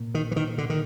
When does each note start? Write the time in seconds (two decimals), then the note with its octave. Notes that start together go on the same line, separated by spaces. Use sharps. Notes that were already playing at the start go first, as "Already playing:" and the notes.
Already playing: A#2
0.15 D#3
0.31 E3
0.36 D#3
0.58 D3
0.70 D#3